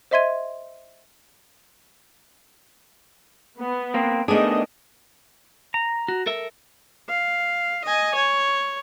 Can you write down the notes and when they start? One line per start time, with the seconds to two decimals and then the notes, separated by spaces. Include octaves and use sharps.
0.11 C5 D#5 E5 C6 G#6 D#7
3.59 B3
3.94 A#3 C4
4.28 D#3 A3 B3 D4 G#4 D#5
5.74 A#5
6.08 F#4
6.26 A4 A#4 E5
7.09 F5
7.85 D#5 G#5
8.15 C#5